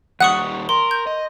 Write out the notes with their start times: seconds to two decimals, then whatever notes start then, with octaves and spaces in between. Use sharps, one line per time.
0.21 D#2 G3 F#5 C#6 D#6 F#6
0.69 A#4 C6
0.91 G6
1.07 D#5